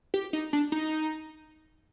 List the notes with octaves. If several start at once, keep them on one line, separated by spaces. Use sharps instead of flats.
G4
D#4
D4
D#4